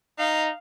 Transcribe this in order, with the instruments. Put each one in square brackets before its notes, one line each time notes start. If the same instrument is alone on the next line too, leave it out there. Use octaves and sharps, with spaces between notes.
[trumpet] D#4 [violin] F5